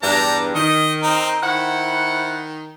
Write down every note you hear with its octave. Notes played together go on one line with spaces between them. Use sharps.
E2 G2 D4 A#5
D#3 D#5
C4 D#4 A#4
D#3 E4 C5 F#5